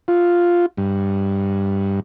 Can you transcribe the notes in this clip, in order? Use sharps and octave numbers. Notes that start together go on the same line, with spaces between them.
F4
G2